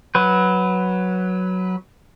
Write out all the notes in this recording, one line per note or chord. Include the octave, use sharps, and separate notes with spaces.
F#3 B4